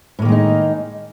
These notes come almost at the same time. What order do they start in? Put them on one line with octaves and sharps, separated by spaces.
A2 A#3 D#3 G#3 D#4